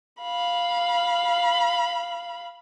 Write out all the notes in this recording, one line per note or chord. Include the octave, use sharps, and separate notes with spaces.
F5 B5